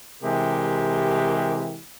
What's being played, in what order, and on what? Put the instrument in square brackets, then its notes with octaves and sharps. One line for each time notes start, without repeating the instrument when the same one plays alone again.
[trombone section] C3 E3 G#3 G4 A#4